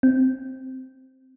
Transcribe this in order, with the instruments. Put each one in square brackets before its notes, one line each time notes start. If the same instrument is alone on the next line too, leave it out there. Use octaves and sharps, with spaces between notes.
[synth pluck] C4